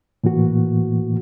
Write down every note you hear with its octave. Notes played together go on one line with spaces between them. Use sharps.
A2 E3 A#3 F#4